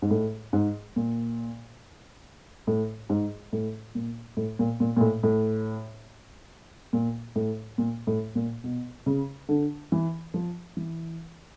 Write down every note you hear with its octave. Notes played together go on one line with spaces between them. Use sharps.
G#2
A2
G#2
A#2
A2
G#2
A2
A#2
A2
A#2
A#2
A#2
A2
A2
A#2
A2
A#2
A2
A#2
B2
C#3
D3
E3
F3
E3